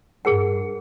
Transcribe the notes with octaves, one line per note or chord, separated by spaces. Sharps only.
G2 G#4 A#4 F#5